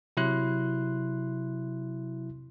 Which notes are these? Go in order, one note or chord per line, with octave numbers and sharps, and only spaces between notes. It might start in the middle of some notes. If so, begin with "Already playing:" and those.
C3 F#3 E4 C6 F#6